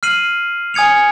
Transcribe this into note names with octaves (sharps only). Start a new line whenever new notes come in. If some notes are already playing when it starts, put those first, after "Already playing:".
F6 C7 D#7 F#7
G#5 D#6 G#6 C#7 F7